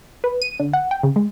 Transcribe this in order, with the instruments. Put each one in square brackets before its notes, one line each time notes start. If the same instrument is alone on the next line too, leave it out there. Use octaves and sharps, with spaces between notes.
[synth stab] B4
D#7
D3
F#5
G5
C#3
G#3